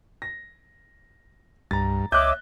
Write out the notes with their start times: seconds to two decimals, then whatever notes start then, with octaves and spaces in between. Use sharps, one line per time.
0.22 A#6
1.71 C2 G2 A#5 A6
2.12 C#2 C#5 D#5 E5 D6 F#6 G6